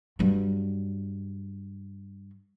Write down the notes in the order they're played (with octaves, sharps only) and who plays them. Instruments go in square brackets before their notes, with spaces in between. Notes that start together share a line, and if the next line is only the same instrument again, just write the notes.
[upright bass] G2 F#3